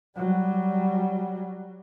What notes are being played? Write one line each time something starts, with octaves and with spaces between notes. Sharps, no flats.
F#3 G3